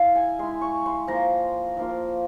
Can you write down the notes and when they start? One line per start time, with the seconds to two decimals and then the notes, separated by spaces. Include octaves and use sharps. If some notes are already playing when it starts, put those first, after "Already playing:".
Already playing: E4 F5
0.15 G#5
0.39 G#3 E4 C6
0.61 C#6
0.86 C6
1.08 F3 A#3 F4 A#5
1.77 F3 A#3 F4